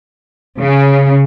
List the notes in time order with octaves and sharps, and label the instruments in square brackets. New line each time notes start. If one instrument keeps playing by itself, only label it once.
[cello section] C#3